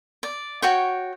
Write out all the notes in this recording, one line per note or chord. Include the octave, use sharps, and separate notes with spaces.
D5
F#4 C#5 G5